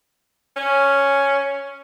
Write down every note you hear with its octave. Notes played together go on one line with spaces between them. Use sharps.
C#4